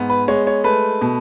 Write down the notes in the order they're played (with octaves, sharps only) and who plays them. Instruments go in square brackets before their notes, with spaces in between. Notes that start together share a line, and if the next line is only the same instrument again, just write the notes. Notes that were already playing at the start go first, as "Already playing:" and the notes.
Already playing: [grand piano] G#2 B3
B4
G#3 C#5
C#5
A3 B4
B2